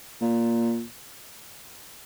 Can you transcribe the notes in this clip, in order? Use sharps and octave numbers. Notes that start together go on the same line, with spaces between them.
A#2